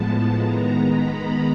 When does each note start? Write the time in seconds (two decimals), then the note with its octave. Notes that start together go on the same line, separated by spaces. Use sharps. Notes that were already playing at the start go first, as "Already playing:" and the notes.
Already playing: A2 F3 G#3 B3 A5
0.36 D#3 G#3 B3 A#5
0.88 B5